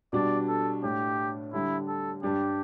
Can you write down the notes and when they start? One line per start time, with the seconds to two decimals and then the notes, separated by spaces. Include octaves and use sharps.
0.13 B2 G3 D4 D5
0.48 A4
0.83 A2 A3 D4 G4
1.53 D3 G3 D4 E4
1.88 A4
2.23 G2 G3 D4 G4